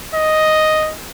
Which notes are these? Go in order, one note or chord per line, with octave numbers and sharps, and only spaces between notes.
D#5